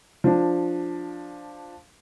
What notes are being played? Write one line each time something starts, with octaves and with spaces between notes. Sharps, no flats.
F3 D4